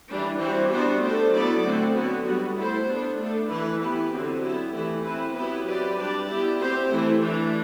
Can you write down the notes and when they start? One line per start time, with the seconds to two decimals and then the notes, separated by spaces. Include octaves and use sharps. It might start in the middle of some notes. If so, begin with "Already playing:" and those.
0.08 E3 G3 D4
0.39 E3 G3 C4 F#4 C5
0.71 G3 B3 D4 F#4 C5
1.02 A3 D4 A4 C5
1.32 F#3 B3 E4 A4 D5
1.64 D3 A3 C4 F#4
1.94 D3 F#3 B3 F#4
2.25 G3 B3 F#4
2.56 A3 E4 A4 C5
2.87 B3 D4 A4
3.18 A3 D4 A4
3.49 E3 A3 E4 B4
3.81 B3 E4 G4 B4
4.11 D3 F#3 C4
4.43 B3 E4 G4
4.73 E3 A3 E4
5.05 C4 E4 B4
5.35 F#3 B3 E4 G4 B4
5.67 C4 G4 B4 D5
5.98 G3 D4 G4 D5
6.29 B3 E4 G4
6.60 C4 G4 C5
6.91 E3 A3 E4
7.21 E3 A3 D4